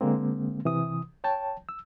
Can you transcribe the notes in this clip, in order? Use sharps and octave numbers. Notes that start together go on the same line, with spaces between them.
D3 G#3 A#3 C4
C3 E3 D#6
C#5 G5 A5
E6